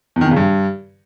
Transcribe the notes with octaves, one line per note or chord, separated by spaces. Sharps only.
E2
D#3
E2
C#3
G2